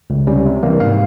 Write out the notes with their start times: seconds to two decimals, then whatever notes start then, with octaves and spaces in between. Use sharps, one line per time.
0.10 C#2
0.27 C3 G3 C#4
0.46 C3
0.63 E3 G3 A#3
0.80 G#2 F5